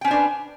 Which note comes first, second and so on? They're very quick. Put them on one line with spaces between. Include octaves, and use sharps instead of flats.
G5 C#4 C5 D4 B4